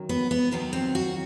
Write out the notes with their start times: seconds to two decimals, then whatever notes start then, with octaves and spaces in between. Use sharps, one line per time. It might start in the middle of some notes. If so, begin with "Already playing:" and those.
Already playing: F#2 D#3 F#3
0.09 B3
0.31 B3
0.51 D#2 D#3 F#3 B3
0.73 C4
0.95 F#4